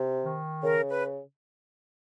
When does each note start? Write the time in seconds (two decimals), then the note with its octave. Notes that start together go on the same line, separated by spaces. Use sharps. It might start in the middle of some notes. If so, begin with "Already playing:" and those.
Already playing: C3
0.24 D#3
0.63 C#3 A#4
0.90 B4